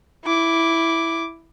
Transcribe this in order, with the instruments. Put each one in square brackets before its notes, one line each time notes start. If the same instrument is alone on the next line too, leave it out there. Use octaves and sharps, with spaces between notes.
[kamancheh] E4 D6